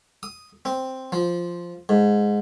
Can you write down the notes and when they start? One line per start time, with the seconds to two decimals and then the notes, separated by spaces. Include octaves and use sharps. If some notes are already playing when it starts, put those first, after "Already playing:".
0.23 D#6
0.65 C4
1.12 F3
1.89 G#2